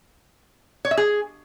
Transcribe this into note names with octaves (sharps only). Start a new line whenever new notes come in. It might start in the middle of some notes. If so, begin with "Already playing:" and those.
C#5
E5
G#4